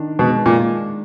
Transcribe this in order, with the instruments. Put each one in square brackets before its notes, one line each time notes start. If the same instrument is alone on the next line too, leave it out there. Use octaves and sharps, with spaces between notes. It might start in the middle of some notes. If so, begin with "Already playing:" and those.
Already playing: [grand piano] D#3 D4
[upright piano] B2 [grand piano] G#3
[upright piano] A#2